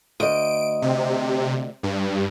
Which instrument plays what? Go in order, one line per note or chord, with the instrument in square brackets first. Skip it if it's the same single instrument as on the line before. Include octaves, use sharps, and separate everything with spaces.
[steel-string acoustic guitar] D2 D#5 [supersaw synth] D7
[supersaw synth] C3
G2